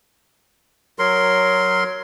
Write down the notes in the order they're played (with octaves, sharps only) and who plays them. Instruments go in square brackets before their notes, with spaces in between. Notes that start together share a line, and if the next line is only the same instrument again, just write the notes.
[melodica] F#3 A#4 C6